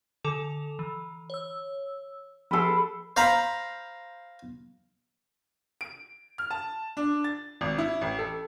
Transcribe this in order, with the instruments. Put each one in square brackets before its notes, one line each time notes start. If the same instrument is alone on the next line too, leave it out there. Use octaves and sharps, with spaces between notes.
[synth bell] D3 A4 F7
E3
C#5 E6
[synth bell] F3 G4 C7 [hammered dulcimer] A4 B4
[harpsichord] C5 F5 A#5 B5
[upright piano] D7
F6
A5
D4
A6
G#1
E4
A1
A4